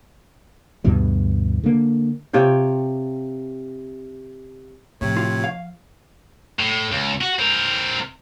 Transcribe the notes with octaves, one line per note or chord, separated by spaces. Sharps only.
D2 G2 B2 E3
D3 A#3
C3 F4 C#5 G5
A2 C3 F3 C#5
F4
F5
A2
C#2
F#4
C4 A#4